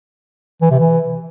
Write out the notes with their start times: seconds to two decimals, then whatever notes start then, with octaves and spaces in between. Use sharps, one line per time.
0.62 E3
0.71 C3
0.80 E3